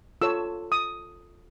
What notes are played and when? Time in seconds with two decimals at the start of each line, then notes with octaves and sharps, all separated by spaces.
0.21 F4 A4 C#5 E6
0.72 D#6